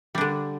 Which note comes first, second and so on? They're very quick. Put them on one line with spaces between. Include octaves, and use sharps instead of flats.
G3 D4 D3